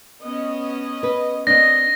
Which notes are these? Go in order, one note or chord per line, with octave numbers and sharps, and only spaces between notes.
B3 C#4 D#5
B4
C4 D4 D#5 A#6